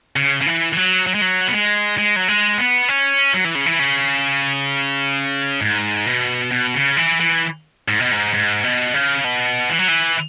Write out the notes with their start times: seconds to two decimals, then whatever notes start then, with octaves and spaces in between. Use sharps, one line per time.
0.16 C#3
0.41 C#3
0.46 E3
0.73 E3
0.77 F#3
1.07 F#3
1.14 G#3
1.21 F#3
1.48 B3
1.52 G#3
1.98 G#3
2.16 F#3
2.28 G#3
2.58 B3
2.88 C#4
3.34 F#3
3.45 E3
3.55 C#3
3.66 E3
3.79 C#3
5.61 G#2
6.06 B2
6.52 B2
6.74 C#3
6.97 E3
7.20 E3
7.88 G#2
7.99 B2
8.11 G#2
8.34 G#2
8.64 B2
8.94 C#3
9.24 B2
9.69 E3
9.79 F#3
9.88 E3